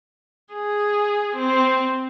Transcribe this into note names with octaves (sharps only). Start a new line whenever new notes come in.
G#4
C4